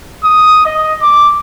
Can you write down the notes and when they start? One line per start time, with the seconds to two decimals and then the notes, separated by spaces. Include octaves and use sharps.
0.25 D#6
0.66 D#5
1.02 D6